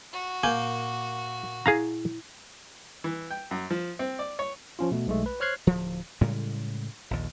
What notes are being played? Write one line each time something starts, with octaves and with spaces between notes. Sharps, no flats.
F#4
A#2 A#3 G#5 G6
E4 G#4 F5 A#5
E3
G5
F#2
F3
C4
D5
C#5
F3 C#4 F4
B2 A3
B1 G#3 A3
B4
C5 C#5 F6 F#6 G#6 C7
D1 F3
A2 C#3 G3 G#3
A#1 D#2